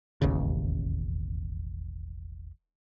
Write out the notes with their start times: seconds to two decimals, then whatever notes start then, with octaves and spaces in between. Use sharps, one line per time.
0.22 E1 A1 D#2 C#3